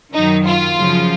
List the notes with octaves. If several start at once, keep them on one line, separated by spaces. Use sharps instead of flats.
F#2 D#3 F#3 D#4
F4
F#2 C#3 F3